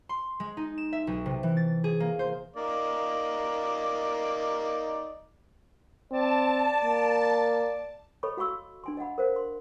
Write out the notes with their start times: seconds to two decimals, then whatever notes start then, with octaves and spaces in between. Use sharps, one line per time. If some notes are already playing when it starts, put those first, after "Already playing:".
0.09 C6
0.40 G#3
0.57 D#4
0.78 E7
0.93 E5
1.07 B1
1.26 C3
1.43 E3
1.57 A6
1.84 G#4
2.00 A#3
2.19 C5
2.56 A#3 D#4 D5
6.12 C4 D5 A5
6.84 A#3
8.23 A4 C#5 D#5 B5 C#6
8.37 F#4 F5 B5 C#6 E6
8.84 D4 G#5 C6
8.97 D#5 F5 F#5 B5
9.18 A#4 C5 F5
9.36 C6